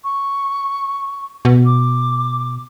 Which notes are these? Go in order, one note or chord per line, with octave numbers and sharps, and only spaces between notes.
C#6
B2
D6